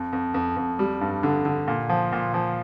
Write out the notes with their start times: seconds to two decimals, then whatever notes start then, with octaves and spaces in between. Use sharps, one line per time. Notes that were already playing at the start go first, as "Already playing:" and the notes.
Already playing: F2
0.13 F2
0.34 F2
0.57 F2
0.79 G3
1.01 G2
1.23 D3
1.45 D3
1.68 A#2
1.89 F3
2.13 A#2
2.34 F3